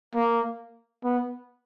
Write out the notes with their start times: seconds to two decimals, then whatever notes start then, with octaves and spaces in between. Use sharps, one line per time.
0.15 A#3
1.04 B3